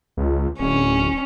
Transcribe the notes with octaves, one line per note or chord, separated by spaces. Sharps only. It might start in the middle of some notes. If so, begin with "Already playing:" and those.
C#2
D1 C#4